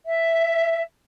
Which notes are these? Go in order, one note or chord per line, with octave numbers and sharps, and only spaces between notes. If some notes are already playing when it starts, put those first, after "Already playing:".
E5